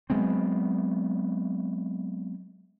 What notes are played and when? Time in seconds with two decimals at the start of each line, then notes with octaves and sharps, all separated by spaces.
0.10 F#3 G#3 B3 C4